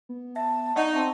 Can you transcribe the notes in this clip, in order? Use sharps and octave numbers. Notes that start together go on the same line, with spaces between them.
B3
E5 A5
D#4 D5 D#5 F#5 C#6
C4 E5 A5